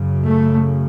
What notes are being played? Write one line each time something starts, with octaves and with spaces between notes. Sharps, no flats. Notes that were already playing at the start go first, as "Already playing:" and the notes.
Already playing: F#2 C#3
A3